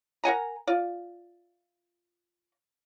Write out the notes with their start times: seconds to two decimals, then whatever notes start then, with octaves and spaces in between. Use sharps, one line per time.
0.24 A#4 F#5 G#5 A#5
0.67 F4 D5